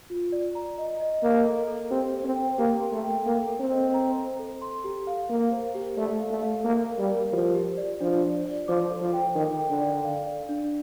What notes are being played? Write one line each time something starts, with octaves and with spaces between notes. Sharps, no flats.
F4
D5
A#5
D#5
D#5
A#3 D#5
A4
A4
C4 G4
C5
C4
G5
A#3 G4
C6
A3
G5
A#3 A4
A4
C4
D#5
A#5
A4
A4
C6
G4
F5
A#3 F5
C5
G4
A3 D5
F5
A3
F5
A#3 A#4
F5
G3
A#4
F3 G4
G4
D5
F3 D4
D5
D5
F3 D6
A4
F3
G5
D#3 G5
G5
D3
D5
F5
D5
D4